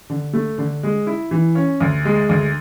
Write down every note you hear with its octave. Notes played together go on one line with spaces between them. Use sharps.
D3
A3
D3
G#3
E4
E3
C#4
D2
G#3
D2